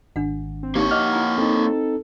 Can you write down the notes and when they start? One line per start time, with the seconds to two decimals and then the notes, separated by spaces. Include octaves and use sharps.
0.16 G#1 D4 F#5
0.63 C4
0.75 A#3 D#4 G4 C#5
0.91 D#5 F#5 D6 F6
1.12 E4 G#5 A#5
1.38 C4 D#4 A4